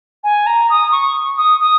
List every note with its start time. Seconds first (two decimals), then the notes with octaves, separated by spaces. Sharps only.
0.24 G#5
0.46 A#5
0.70 D#6
0.92 C#6
1.38 D#6
1.60 D#6